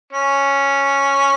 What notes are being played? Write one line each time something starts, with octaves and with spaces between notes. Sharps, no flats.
C#4